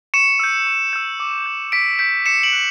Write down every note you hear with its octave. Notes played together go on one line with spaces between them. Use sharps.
C#6 C#7 E7
E6 G6
C#6
E6 G6
D6
G6
D6 B6 D7
G6 B6 D7
D6 C#7 E7
D7 F#7
F#6